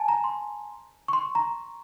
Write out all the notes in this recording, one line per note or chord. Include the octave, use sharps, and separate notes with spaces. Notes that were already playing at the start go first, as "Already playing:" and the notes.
Already playing: G#5 A5
A#5
C6
C#6
C6
A#5